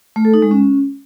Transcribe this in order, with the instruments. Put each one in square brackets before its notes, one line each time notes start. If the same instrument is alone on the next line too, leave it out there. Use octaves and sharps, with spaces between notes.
[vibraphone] A3
A4
D#4
G#3
C#4